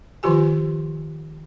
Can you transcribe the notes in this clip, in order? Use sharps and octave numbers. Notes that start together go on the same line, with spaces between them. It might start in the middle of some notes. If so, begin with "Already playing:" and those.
D#3 F3 F4 G4 G#5